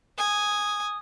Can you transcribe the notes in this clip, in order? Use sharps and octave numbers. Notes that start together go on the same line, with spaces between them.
G#5 D#6